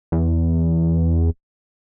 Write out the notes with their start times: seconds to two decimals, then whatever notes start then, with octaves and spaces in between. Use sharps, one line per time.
0.12 E2